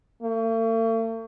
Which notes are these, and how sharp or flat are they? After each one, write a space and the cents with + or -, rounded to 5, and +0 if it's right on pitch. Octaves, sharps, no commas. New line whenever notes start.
A3 +45